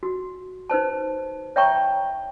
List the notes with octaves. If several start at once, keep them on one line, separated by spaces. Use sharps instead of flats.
F#4
D#4 B4 C5 A5
C#5 E5 G5 A5 A#5 C#6